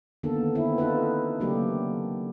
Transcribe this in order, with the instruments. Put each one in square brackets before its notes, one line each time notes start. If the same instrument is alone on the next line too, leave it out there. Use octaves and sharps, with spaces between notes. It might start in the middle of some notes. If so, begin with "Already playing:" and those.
[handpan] D3 D#3 A#3 B3 A4
B3 C4 E4
D#4 F4 A4 B4
C#3 F#3 A3 A#3 D4 G4